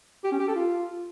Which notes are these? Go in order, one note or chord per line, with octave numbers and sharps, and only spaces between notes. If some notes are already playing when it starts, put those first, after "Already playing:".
G4
C#4
G4
A4
F4